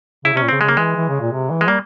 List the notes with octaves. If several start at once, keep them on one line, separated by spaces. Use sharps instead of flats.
C#3 E4
C3 C#4
A#2
C#3 C4
C#3 G#3
A#3
E3 G#3
E3
C#3
A#2
C3
E3
G#3
G3 A#3